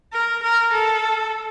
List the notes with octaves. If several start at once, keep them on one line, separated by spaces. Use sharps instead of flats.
A#4
A#4
A4